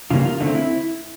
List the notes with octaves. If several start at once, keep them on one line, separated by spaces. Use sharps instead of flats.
C#3 E3 G3 A#3 F4
F4
D3 F#3 A3 C4 D#4
E4